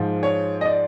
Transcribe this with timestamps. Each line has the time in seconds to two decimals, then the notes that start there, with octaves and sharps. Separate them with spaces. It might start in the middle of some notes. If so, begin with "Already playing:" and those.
Already playing: G#2 F3
0.23 C#5
0.61 D#5
0.66 D5